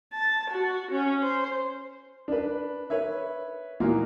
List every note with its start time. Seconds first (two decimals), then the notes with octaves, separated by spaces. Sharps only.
0.13 A5
0.51 F#4
0.92 C#4
1.22 C5
2.28 D4 B4
2.90 B4 C#5 E5
3.80 A#2 E3 A#3 D#4 F4 F#4